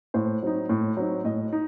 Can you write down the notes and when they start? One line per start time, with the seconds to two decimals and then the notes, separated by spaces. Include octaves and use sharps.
0.14 A2 C5
0.42 F#3 C4 D#4
0.69 A2
0.97 F#3 C4 D#4
1.25 A2 D#5
1.53 D#4